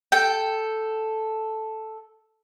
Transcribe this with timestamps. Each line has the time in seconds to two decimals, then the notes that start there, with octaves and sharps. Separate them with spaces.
0.12 A4 G5